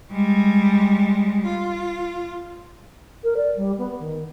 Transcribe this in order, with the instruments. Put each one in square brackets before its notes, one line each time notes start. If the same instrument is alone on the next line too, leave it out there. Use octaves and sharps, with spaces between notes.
[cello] G3 G#3
F4
[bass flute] A#4
D5
G3
B3
D#3